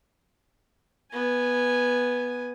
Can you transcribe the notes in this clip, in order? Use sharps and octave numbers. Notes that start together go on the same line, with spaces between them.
B3 G#5